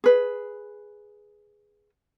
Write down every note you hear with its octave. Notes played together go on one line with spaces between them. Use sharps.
G#4 B4